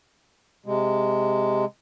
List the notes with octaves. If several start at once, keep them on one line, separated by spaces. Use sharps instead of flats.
C3 G#3